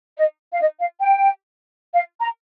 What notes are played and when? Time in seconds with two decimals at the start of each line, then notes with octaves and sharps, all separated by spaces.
0.16 D#5
0.53 F5
0.60 D#5
0.79 F5
0.99 G5
1.93 F5
2.19 A#5